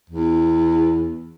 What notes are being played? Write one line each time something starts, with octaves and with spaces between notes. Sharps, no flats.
E2